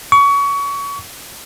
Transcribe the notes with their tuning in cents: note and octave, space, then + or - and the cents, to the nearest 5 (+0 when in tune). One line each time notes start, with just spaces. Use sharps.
C#6 +25